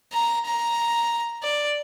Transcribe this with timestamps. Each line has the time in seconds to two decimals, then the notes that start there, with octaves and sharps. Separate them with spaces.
0.13 A#5
0.46 A#5
1.43 D5